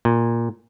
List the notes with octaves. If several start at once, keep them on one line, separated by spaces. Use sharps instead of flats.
A#2